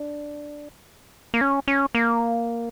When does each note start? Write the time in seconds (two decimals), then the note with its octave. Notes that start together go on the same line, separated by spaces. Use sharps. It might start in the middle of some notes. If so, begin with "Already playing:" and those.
Already playing: D4
1.34 A#3
1.41 C#4
1.68 C#4
1.95 A#3